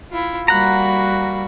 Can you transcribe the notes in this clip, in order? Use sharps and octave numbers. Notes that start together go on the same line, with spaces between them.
E4 F4
G3 A#3 F#4 F#5 A#5 B5